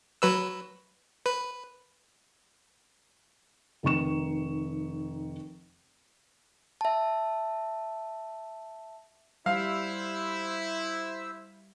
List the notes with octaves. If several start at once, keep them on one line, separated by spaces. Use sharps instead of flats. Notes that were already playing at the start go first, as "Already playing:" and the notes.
F#3 B4 E6
B4
F1 D#3 D#4 C#6 E7
E5 A5
G3 E4 C5 E5 F5 E6